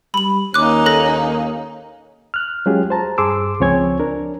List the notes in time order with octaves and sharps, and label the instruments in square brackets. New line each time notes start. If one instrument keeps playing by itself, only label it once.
[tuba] G3 [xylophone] B5 F#7
[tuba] D#2 [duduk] A#3 [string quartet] C#4 D#4 [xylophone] D6 F#6
[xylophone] A4 F#6 A#6
[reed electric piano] F6 F#6
F#3 G#3 C#4 F4 G4 G#4
C5 A5 A#5
G2 G#4 C6 D6 E6
C#2 F3 C4 C#5 G#5 G#6
D4 A#4